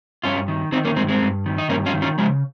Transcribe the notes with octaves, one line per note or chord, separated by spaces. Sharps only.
G2 C#4 F4
D#3
D#3 C4 D#4
A#3 C#4
G2 G#3 C4
G#3 C4
G2
D#3
D#4
G2 A#3 C#4
C#4 F4
D#3
C#4 F4
C#3 F3 G#3